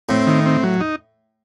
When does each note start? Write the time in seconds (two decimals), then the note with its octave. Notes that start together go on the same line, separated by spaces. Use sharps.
0.09 A2 C4
0.27 D#3
0.46 C4
0.63 F#3
0.80 D#4